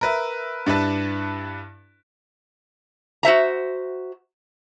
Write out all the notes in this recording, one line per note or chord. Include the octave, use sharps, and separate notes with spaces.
A#4 B4 E5
G2 D4 E4 B4 A5
F#4 C5 E5 A#5